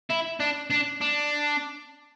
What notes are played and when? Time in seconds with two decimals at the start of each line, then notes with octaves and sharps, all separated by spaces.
0.10 E4
0.40 D4
0.70 D4
1.01 D4